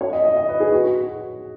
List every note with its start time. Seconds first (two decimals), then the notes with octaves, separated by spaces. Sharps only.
0.01 C#5
0.13 D#5
0.25 D#5
0.36 D#5
0.48 B4
0.60 G#4
0.72 F#4
0.84 F#4